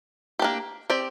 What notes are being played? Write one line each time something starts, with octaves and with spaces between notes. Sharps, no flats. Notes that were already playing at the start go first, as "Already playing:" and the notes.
A#3 D4 G4
C4 G4 D5